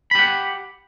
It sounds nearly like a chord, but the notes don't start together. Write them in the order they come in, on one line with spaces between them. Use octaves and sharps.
B5 G4 F#5